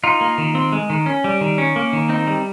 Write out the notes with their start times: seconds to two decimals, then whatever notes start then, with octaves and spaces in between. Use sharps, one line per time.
0.04 D#4 F4
0.21 A#3
0.38 D#3
0.55 C4
0.72 G#3
0.90 D#3
1.06 C#4
1.24 G3
1.41 D#3
1.58 C#4
1.76 A#3
1.93 D#3
2.09 C4 D#4
2.27 G3